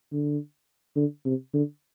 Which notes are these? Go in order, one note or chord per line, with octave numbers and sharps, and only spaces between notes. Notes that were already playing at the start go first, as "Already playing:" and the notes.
D3
D3
C3
D3